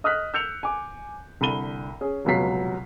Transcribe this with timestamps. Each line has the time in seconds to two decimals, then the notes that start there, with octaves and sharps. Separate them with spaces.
0.04 D#5 D#6 F6 F#6 B6
0.34 E6 G6 C#7 F7
0.63 G#5 D6
1.41 C2 D3 B5 D#7 G7
2.01 C#4 G#4
2.25 F1 C#2 B2 F#3 B6 C7